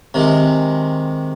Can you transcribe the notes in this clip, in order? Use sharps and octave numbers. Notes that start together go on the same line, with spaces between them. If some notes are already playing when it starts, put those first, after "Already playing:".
C3 D#3 G#3